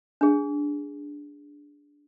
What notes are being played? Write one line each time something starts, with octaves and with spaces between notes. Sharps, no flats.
D4 G#4